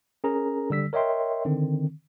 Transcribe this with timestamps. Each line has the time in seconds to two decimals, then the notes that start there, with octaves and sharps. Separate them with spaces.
0.24 C#4 G#4 A#4 A#5
0.70 D3 G3 E6 B6
0.93 A#4 C#5 D#5 E5 G5 C6
1.45 D3 D#3 C4